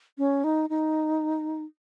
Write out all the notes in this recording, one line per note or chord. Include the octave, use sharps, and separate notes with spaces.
C#4
D#4
D#4